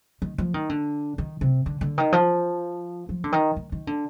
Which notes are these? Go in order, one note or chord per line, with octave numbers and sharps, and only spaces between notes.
D#3
F3
D#3
D3
D#3
C3
D3
D3
D#3
F3
F3
D3
D#3
D#3
D#3
D3